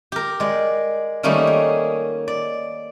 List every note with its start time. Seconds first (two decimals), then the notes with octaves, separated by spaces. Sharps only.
0.12 G4 A#4
0.40 G#3 D5
1.23 D#3 G3 A3 A#3 C#4 D#4
1.47 G#4
2.28 D5